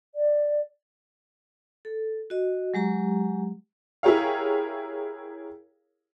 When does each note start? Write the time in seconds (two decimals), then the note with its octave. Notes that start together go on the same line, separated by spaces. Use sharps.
0.15 D5
1.85 A4
2.30 F#4 D#5
2.74 F#3 G#3 G4 A#5
4.03 E4 G4 G#4 A#4 C#5 F5